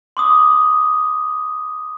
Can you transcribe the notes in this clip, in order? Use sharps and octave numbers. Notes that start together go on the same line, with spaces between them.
C6 D6 D#6